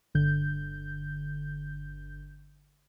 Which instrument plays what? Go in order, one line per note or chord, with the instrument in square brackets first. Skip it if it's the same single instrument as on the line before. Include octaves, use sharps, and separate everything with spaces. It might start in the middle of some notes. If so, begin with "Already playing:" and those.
[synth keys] G1 D3 G6